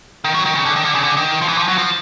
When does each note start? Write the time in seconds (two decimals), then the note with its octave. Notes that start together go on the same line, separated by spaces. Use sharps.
0.24 D#3
0.34 F#3
0.45 D#3
0.55 C#3
0.65 D3
0.76 D#3
0.85 D3
0.95 C#3
1.04 D3
1.17 D#3
1.42 F3
1.48 E3
1.57 F3
1.68 F#3
1.78 F3